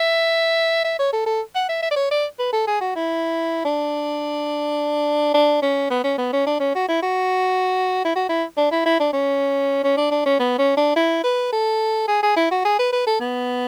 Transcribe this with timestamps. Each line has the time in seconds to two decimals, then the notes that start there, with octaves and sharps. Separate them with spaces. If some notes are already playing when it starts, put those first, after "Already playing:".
Already playing: E5
0.84 E5
0.99 C#5
1.13 A4
1.26 A4
1.55 F#5
1.69 E5
1.82 E5
1.91 D5
1.96 C#5
2.11 D5
2.39 B4
2.53 A4
2.67 G#4
2.81 F#4
2.96 E4
3.65 D4
5.34 D4
5.62 C#4
5.90 B3
6.04 C#4
6.18 B3
6.33 C#4
6.46 D4
6.60 C#4
6.75 F#4
6.88 E4
7.02 F#4
8.05 E4
8.15 F#4
8.29 E4
8.57 D4
8.71 E4
8.86 E4
9.00 D4
9.13 C#4
9.84 C#4
9.97 D4
10.11 D4
10.25 C#4
10.39 B3
10.58 C#4
10.77 D4
10.96 E4
11.24 B4
11.52 A4
12.08 G#4
12.23 G#4
12.36 E4
12.51 F#4
12.65 G#4
12.79 B4
12.92 B4
13.07 A4
13.20 B3